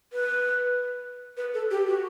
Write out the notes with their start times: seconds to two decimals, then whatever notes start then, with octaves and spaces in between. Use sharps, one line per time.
0.13 B4
1.37 B4
1.54 A4
1.71 G4
1.88 F#4